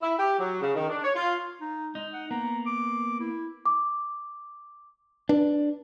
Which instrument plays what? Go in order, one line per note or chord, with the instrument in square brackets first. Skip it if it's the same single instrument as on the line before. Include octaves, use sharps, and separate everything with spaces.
[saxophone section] E4
G4
F#3
C#3
D#3
D4
C#5
F4
[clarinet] D#4
[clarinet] G#3 [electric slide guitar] D#4
[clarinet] F#5
[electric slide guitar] A#3 B3 [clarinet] A#5
[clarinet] D6
E4
[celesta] D6
[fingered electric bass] D4 [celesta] B4